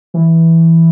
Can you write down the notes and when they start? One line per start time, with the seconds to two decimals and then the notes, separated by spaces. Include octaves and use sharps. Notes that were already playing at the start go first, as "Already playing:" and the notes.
0.14 E3